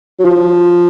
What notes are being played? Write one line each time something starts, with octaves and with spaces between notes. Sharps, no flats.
F#3
F3